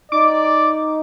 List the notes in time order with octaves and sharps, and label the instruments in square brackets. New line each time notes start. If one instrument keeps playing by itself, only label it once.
[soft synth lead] D#4 [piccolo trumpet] D5 [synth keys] D6